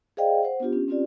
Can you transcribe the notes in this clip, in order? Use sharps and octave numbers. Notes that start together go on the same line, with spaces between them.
G#4 C5 D5 D#5 F5 G5
C5 F#5
B3 D4 F4 G4
C#4
C4 C#4 F4 G4 D5